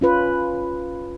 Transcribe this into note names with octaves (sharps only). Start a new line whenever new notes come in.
C#4 F4 B4